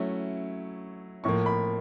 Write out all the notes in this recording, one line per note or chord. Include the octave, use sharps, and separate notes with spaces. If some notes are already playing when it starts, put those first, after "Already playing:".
Already playing: F#3 A3 C#4 E4
A2 F3 A#3 C#6
B5